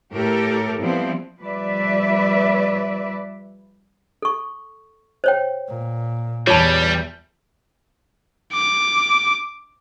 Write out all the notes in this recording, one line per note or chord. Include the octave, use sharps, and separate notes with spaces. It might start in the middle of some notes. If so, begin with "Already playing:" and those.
A2 G4 A4 A#4
F3 G3 B3 C4 E4
F3 G3 B4 D5 E5
A4 C#6
C5 C#5 G5
A#2
E2 E3 G3 F4 C#5 A5
D6